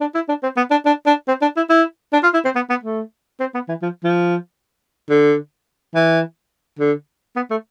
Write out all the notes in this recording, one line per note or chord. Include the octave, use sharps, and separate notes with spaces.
D4
E4
D4
C4
B3
D4
D4
D4
C4
D4
E4
E4
D4
F4
E4
C4
B3
B3
A3
C4
B3
E3
F3
F3
D3
E3
D3
B3
A3